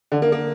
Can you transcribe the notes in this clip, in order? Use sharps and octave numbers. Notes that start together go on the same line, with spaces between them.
D3
A#3
A#3